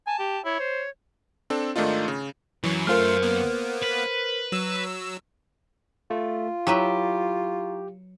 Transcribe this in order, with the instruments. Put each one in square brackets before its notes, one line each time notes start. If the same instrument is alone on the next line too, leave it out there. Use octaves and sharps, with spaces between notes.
[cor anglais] G#5 [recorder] A5
[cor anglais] G4
[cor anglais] E4 [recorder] C#5
[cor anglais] C5
[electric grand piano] C4 D4 A4
G#2 D#3 A3 D4 D#4 F4
C#3
[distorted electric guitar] F#2 [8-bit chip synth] E3 F#3
[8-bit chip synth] A3 F4 [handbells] A#4 C5 F6
[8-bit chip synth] A#3 B3
[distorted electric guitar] B4
[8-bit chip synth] F#3 E6
[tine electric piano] A3 [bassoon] F4
[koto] F#3 B4 E5 [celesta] E4 A#5 C#6 [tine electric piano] G4